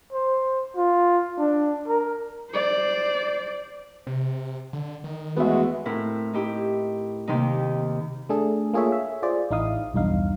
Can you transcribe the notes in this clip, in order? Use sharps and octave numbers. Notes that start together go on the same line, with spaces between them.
C5
F4
D4
A#4
C5 D5
C3
D3
D#3
E2 G#3 A3 B3 F#4 E5
A2 C4 E4 A#4
D#4 E4 G4
D#2 C3 D#3 D#4
A3 D4 G#4 A4
A#3 F4 G#4 A4 C#5 E5
E5
F4 G#4 C5 D5
A1 D#4 E4 F5 D#6
B1 E2 G2 D#4 F5